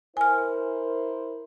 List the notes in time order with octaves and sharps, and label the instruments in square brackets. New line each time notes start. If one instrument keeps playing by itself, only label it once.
[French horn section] E4 A#4 C5 [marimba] G#5 F6